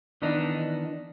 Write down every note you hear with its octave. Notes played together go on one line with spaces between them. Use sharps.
D#3 E3 B3 D4 D#4